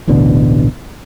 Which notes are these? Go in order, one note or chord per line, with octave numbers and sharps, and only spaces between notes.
D1 A1 B2 D3